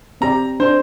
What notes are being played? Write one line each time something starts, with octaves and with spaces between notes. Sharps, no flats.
C4 G4 D5 A#5
D4 C5